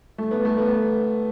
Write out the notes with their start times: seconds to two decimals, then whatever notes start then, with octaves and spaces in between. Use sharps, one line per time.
0.18 A3
0.31 B3
0.45 A3
0.58 B3